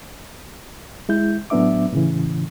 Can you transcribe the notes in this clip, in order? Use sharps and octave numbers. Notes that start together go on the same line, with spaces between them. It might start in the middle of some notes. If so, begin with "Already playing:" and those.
G#3 E4 G6
A2 F#3 B3 D4 E5 D6
A2 C#3 E3